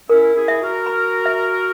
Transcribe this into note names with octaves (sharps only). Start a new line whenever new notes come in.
C#4 E4 A#4
E4 G#4
E5
F#4 A#4
B5
E5